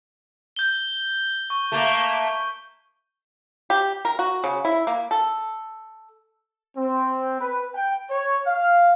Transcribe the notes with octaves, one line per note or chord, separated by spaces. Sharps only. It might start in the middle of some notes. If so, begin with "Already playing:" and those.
G6 G7
C#6
A3 A#3
G4
A#4
F#4
C#3
E4
A#3
A4
C4
B4
G5
C#5
F5